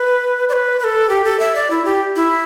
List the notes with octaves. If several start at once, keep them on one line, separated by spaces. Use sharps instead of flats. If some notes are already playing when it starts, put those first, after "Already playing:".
Already playing: B4
D5
B4
B4
A4
G4
A4
E5
D5
E4
G4
E4